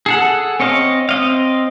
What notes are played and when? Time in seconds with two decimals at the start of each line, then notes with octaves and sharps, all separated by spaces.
0.06 G#4 A4 F#5
0.60 C4 C#5 D#5 F5
1.09 C4 D#5 F5